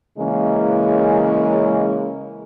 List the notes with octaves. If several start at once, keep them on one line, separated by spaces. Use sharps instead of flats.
C#3 E3 G#3 A#3 C#4